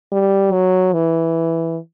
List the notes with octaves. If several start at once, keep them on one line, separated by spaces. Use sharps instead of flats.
G3
F#3
E3